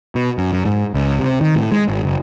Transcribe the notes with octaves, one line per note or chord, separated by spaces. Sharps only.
B2
F#2
F#2
G#2
C#2
C3
D#3
A2
G#3
G#1
F#1